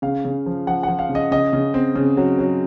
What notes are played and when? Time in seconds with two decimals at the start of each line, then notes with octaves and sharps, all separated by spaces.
0.02 C#3 F5
0.25 C#3
0.46 F3
0.67 F3 F#5
0.83 F3 F#5
0.99 F5
1.09 C#3
1.15 D#5
1.31 C#3 D#5
1.53 C#3
1.74 C4
1.96 C#3
2.17 F#3
2.39 F#3